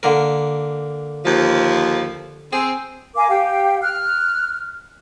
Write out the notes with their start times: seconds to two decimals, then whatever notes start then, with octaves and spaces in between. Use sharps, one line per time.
0.03 D3 A#3 A#4
1.25 D#2 F3
2.53 C4 G#4
3.15 A#4 F5 G#5 D6
3.29 G4 F5 G5
3.81 F6 F#6